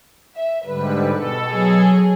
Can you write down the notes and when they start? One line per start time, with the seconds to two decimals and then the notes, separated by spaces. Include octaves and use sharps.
0.35 E5
0.65 G#2 D3 G3 B4
1.14 B2 A4
1.49 F#3 G#4